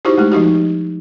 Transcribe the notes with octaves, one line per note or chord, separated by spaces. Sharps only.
D#4 E4 F#4 G4 C5 C#6
G#3 A3 G4
F3 D#4 F#4 G4